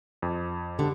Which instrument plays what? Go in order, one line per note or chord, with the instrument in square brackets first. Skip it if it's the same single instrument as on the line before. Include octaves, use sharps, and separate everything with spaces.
[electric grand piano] F2
[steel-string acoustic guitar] D3 [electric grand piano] G4